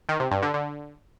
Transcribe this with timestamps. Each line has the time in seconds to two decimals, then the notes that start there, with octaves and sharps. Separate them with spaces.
0.09 D#3
0.20 C3
0.31 G2
0.43 D3
0.54 D3